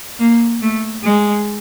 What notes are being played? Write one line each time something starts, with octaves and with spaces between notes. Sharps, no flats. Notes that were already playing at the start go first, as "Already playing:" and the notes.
A#3
A3
G#3